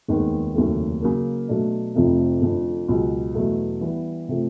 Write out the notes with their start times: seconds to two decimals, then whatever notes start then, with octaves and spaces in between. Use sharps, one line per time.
0.08 F1 D#2 D#3 G#3 B3
0.56 F1 D#2 C#3 F#3 A3
1.02 C#3 F#3 A#3
1.48 B2 F#3 A3 D4
1.95 F1 F2 C3 F3 A3
2.41 F1 F2 D3
2.88 C#2 B2 F#3
3.35 E2 B2 F#3 A3
3.81 E3 G3 B3
4.28 C3 F3 A3